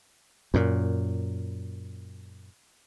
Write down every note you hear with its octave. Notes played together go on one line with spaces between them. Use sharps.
F#2 A#2